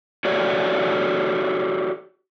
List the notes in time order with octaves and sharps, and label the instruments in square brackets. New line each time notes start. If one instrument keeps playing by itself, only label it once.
[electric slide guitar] F#4 G4 A4 C#5 D5